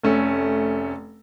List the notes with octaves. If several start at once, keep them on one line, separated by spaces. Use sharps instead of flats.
F1 A3 C#4 A4 E5